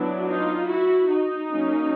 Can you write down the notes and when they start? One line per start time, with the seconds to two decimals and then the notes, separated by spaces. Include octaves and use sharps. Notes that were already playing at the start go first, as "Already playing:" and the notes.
Already playing: F#3 B3 D4 E4
0.27 D#4 F4
0.68 E4 F#4
1.09 D#4
1.51 F#3 A#3 C#4